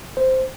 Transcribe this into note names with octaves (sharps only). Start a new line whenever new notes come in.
C5